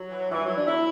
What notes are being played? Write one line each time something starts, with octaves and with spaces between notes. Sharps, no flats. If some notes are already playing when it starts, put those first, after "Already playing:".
Already playing: F#3
E3
G2 E3
F#3
E3
D4
E2 E4